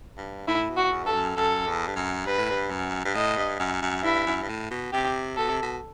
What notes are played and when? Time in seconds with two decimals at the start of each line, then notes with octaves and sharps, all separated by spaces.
0.18 G2
0.48 A2 E4
0.69 B2
0.77 F#4
0.92 E2
1.04 G2 A4
1.14 F#2
1.37 F#2 A4
1.67 E2
1.87 G2
1.96 F#2
2.26 G2 B4
2.38 A2
2.51 G2
2.70 F#2
3.05 G2
3.15 A2 D#5
3.37 G2
3.59 F#2
3.82 F#2
4.03 G2 E4
4.26 F#2
4.42 G2
4.49 A2
4.71 B2
4.93 C3 G4
5.37 B2 A4
5.49 C3
5.62 B2